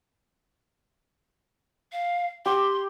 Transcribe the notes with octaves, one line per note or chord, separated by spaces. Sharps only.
F5
G4 C6